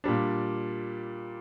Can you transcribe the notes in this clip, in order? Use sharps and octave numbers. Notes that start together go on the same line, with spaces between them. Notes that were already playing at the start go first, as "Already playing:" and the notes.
A#2 G3 D4